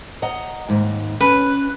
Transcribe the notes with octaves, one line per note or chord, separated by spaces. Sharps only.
D#5 F#5 A#5
D#2 G#2
C#4 B4